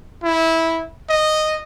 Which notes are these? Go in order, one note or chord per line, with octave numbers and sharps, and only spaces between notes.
E4
D#5